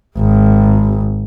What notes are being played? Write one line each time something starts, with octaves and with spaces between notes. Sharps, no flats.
G#1